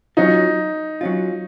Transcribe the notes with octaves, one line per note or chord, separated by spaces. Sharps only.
F#3 C#4 D#4 F4
F#3 C#4 F4